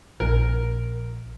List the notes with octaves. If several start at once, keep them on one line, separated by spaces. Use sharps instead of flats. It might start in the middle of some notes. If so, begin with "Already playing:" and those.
A#1 A#4